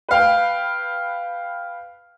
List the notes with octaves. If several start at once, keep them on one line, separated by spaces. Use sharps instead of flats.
B4 F5 G5